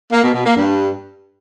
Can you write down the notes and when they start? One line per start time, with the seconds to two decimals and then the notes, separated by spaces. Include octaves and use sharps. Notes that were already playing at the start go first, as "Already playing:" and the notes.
0.13 A#3
0.24 B2
0.35 B2
0.46 A#3
0.57 G2